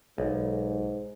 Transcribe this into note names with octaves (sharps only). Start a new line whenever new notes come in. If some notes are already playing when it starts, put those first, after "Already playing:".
B1 G#2